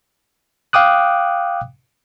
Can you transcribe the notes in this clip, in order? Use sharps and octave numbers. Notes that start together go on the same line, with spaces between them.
F5 G5 D6 D#6 F#6